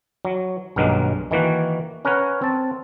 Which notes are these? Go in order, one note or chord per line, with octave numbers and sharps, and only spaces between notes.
F#3
B1 G2 D#3 F#3 G#3 A#3
D#3 E3 A#3 F#4
C#4 A#4 B4 C#5 F#5
C4 A5